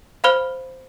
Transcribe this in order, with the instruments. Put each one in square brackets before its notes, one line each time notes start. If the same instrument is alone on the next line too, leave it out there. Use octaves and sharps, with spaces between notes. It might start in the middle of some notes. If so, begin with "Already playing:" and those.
[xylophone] C5 F5 B5 F6